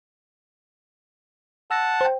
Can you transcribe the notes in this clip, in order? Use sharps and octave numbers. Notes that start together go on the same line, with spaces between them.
F#5 A5 E6 A#6
C5 G5